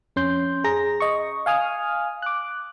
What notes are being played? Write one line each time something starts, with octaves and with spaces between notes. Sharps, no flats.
F2 C#4 C6 G6
G#4 A#5 A#6
D#5 C#6
F5 G#5 D#6 F6
D6 F#6